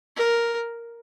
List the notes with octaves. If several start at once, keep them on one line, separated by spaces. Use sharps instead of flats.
A#4